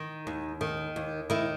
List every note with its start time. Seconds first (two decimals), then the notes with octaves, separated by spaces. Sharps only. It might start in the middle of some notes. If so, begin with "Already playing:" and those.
Already playing: D#3
0.27 D#2
0.61 D#3
0.96 D#2
1.30 D#3 E4